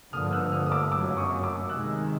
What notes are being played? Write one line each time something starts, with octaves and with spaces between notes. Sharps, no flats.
G2 D3 F3 A#3 D#6 F6
E6 F#6
D#6 F6
D#6
D6 E6
F#2 C#3 F#3 A#3 D6 E6
C#6 D#6
D6 E6
C3 D#3 G#3 E6 F#6